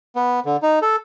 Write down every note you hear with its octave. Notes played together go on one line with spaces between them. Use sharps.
B3
D3
D#4
A4